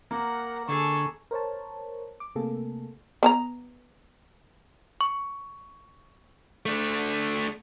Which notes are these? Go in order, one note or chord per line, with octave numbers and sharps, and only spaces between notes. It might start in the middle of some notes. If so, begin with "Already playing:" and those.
A#3 A#4 F#5
D3 G#4 A4 C#6
A#4 C5 C#5 A5
D6
C3 A3 A#3 G#4 A4
B3 A5 A#5
C#6
A3 D4